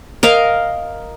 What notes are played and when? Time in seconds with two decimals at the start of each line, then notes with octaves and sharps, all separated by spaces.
0.23 A#4 D#5 F5